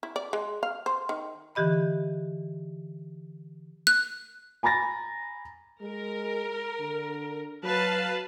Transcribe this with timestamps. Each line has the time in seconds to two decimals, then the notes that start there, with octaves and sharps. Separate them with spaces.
0.03 E4
0.16 D5
0.33 G#3
0.63 F5
0.86 C5
1.09 D#3
1.55 D3 E3 G4 D#5 B5
3.87 F#6
4.63 G#5 A#5 B5 A6 A#6
5.82 G#3 A#4
6.80 D3
7.64 F#3 B4 F5 A5